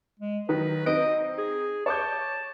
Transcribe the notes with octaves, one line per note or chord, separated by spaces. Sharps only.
G#3
D#3 F#3 B4
C4 D#4 D#5 D7
G#4
C#5 A5 D6 G6